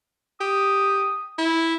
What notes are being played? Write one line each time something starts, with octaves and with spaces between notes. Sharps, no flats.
G4 D#6
E4